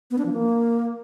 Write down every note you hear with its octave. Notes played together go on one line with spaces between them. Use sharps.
B3
D4
F3
A#3